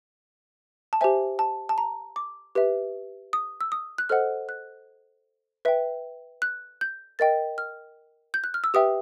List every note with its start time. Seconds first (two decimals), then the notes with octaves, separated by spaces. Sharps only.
0.93 A5
1.01 G4 C5 E5 G#5
1.39 A5
1.69 A5
1.78 A#5
2.16 D6
2.55 G4 B4 E5
3.33 D#6
3.61 E6
3.72 D#6
3.98 F#6
4.09 A4 C5 D#5 F#5 F6
4.49 F#6
5.65 B4 E5 G5
6.42 F#6
6.81 G6
7.19 A#4 D#5 G5 A6
7.58 F6
8.34 G6
8.44 F#6
8.54 F6
8.64 E6
8.74 G4 B4 E5 G5 D#6